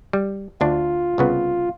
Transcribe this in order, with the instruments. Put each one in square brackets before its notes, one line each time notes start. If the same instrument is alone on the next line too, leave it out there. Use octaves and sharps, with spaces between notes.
[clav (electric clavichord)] G3
[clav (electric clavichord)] D2 D4 [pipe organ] F4
[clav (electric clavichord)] C2 C#3 B3